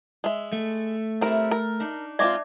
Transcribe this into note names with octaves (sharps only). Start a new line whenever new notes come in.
G#3 E5
A3
G3 C4 E4 A#4
A#4
D4 D#4
G#3 C4 F4 D5 E5 D6